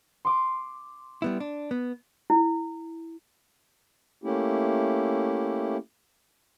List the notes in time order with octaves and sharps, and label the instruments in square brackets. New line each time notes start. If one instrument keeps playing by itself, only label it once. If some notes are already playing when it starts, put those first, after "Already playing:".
[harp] C6 D6
[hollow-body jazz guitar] G3 B3 E4
D4
B3
[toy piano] E4
[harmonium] A3 A#3 C#4 E4 G4